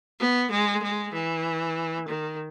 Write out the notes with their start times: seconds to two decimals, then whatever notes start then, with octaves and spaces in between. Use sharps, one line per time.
0.19 B3
0.51 G#3
0.83 G#3
1.13 E3
2.08 D#3